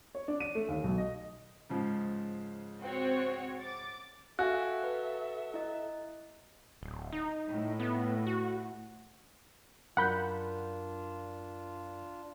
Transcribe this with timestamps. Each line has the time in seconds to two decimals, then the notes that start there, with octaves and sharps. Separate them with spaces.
0.15 C#5
0.28 D4
0.40 D#7
0.55 A3
0.68 D#2
0.84 B1
0.98 D#5
1.69 G#2 C#3 F3
2.82 C4 F#4 C#5
3.61 D6 A6
4.39 F#4 A4 E5 F5 G#5 F#6
4.84 B4
5.54 E4 D#5
6.82 D1
7.13 D#4
7.50 A2
7.80 B3
8.27 F#4
9.97 F#2 D4 F4 A#4 F#5 B5 G6